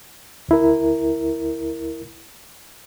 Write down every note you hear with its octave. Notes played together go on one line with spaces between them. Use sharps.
D2 E4 A#4